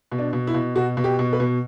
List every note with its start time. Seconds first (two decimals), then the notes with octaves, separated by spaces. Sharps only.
0.12 B2
0.18 D4
0.33 B2
0.47 E4
0.54 B2
0.75 B2 F#4
0.97 B2
1.04 G4
1.19 B2
1.33 B4
1.40 B2